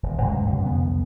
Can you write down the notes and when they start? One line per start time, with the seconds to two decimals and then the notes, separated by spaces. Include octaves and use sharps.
0.03 D#1
0.21 G2 C#3 F#3 G#3
0.44 C#2 F#2 B2
0.63 C2 F2 D3 B3